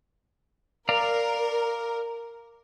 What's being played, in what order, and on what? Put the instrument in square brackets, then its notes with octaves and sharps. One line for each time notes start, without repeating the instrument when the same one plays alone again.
[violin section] A#4 [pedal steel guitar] D5 F5 A#5